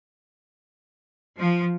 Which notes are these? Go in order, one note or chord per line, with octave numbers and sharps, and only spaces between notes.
F3